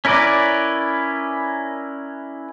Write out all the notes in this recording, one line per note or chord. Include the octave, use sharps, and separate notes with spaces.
C#4 E4 A#4 B4 D5